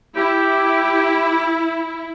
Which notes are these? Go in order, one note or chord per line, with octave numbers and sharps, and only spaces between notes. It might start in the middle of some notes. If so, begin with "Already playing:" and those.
E4 G4